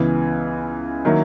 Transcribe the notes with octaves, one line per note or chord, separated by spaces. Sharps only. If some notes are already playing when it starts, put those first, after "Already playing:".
Already playing: C#2 C#3 E3 B3
D#3 F#3 A#3 E4